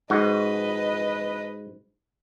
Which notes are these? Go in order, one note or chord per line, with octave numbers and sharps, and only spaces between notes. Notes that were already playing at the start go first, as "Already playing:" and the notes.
G#2 F#4 B4 D#5